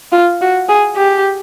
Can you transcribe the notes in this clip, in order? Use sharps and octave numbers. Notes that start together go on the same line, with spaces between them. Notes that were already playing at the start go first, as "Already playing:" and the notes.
F4
F#4
G#4
G4